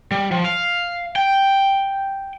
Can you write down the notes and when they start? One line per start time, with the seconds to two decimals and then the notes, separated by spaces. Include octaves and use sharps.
0.11 G3
0.31 F3
0.45 F5
1.16 G5